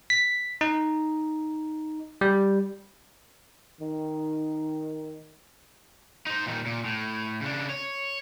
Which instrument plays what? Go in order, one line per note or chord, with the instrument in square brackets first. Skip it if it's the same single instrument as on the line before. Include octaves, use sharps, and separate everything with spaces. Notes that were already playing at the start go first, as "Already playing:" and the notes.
[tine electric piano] B6
D#4
G3
[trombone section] D#3
[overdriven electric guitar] D#4 C5
A#2 D#3
A#2
A2
C#3 D4
C#5